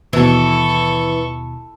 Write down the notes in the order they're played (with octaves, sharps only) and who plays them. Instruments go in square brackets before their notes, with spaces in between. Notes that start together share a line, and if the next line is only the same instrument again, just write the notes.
[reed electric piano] D#2 B2 [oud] E3 [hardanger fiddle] A4 C#6